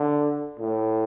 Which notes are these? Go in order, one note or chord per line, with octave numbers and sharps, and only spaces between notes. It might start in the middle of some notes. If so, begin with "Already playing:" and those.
Already playing: D3
A2